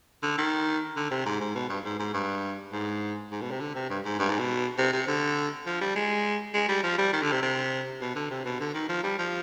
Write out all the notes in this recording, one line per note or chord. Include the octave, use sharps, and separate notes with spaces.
D3
D#3
D3
C3
G#2
G#2
B2
G2
G#2
G#2
G2
G#2
G#2
B2
C3
D3
C3
G2
G#2
G2
G#2
B2
C3
C3
D3
F3
G3
G#3
G#3
G3
F3
G3
D#3
D3
C3
C3
B2
D3
C3
B2
D3
D#3
F3
G3
F3